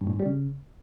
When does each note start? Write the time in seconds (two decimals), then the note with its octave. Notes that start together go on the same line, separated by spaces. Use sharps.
0.01 G2
0.07 A2
0.13 G#2
0.20 G3
0.26 C#3